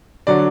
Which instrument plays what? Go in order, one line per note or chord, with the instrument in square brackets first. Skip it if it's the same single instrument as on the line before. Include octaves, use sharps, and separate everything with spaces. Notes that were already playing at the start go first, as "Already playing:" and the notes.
[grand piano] D3 F#3 D5